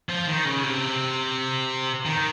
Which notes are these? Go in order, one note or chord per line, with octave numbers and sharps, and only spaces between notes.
F3
D#3
C#3
C3
D#3